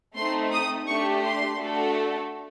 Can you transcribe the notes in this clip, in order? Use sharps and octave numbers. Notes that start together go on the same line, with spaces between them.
A3 C4 D#4 C6
D#6
A3 D4 G4 C#6
C6
A3 D4 F#4 A4